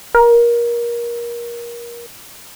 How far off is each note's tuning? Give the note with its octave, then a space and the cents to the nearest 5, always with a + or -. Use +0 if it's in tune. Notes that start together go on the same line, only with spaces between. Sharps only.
A#4 +25